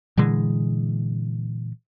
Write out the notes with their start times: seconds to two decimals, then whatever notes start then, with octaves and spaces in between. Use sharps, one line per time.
0.17 A#2 D3 E3 G#3